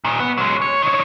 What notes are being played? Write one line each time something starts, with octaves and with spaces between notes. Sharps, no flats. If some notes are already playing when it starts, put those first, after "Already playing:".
A#2 D#3
B3
F#3 G#3
C#5
D#3 C#5